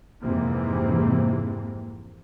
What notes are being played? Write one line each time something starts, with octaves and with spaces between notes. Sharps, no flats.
F2 G#2 C3 E3 A#3 C4